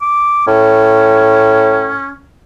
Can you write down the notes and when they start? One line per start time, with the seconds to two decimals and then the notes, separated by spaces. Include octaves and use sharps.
0.02 D6
0.47 A2 C#4